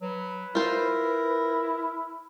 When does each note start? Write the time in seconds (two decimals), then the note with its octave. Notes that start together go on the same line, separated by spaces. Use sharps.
0.02 F#3 B4
0.55 E4 F4 A#4 C5